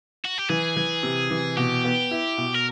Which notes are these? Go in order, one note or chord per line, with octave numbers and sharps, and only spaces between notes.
F#4
G4
E3 G#4
E3
C3
E3
B2 G4
B3
E4
B2
A#4